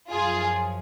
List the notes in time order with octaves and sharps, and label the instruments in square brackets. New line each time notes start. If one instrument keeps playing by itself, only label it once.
[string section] F#2 F3 F4 G#4